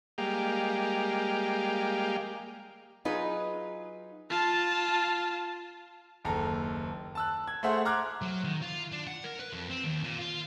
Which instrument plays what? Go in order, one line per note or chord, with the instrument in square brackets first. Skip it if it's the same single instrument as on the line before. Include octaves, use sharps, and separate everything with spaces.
[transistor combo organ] G3 G#3 A#3 G4 F5
[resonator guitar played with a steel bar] F#3 D#4 F4 G#4 B4
[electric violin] F4 A5
[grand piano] F#1 D#2 A4 A#5
A5 E6 F#6
G#6
A3 G#4 C5 E5 F#5
A#5 C6 D6 F6 F#6 G#6
[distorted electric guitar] F#3
D#3
F4
D4
F#5
A#4
B4
F2
C4
D#2
A#2
F4